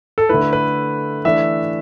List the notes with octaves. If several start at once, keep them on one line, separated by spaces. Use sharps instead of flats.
A4
D3 A3 E4 B4
B4
E3 A3 D4 E5